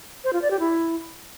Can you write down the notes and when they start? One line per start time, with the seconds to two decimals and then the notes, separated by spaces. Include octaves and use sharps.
0.24 C5
0.33 F4
0.42 D5
0.51 G4
0.60 E4